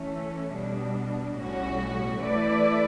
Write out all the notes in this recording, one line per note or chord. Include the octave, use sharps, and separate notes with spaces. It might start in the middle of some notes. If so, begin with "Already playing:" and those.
Already playing: E3 A3 C#4
B2 G3 D4
B1 A2 G3 C#4 F#4
E3 A3 E4 B4 D5